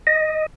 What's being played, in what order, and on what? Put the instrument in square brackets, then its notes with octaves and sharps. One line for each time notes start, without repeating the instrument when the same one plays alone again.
[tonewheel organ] D#5